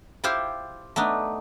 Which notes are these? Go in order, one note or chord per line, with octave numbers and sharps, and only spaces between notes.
E4 F4 G4 C5 F5
A3 B3 D4 D#4